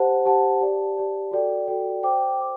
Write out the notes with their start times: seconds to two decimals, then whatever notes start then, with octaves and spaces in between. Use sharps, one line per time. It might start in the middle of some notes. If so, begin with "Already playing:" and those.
Already playing: G4 C5 F#5 A5
0.25 G4 C5 F#5 A5
0.61 G4 D5 A5
0.96 G4 D5 A5
1.31 F#4 A4 D5 G5
1.68 F#4 A4 D5 G5
2.03 C5 G5 D6
2.39 C5 G5 D6